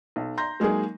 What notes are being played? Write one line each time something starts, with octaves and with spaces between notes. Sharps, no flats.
B1
A#5 C6 G6 A#6
F#3 G#3 A#3 D#4 G#4